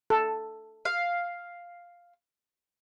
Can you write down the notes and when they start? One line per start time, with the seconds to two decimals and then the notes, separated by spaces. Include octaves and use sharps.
0.10 A4
0.85 F5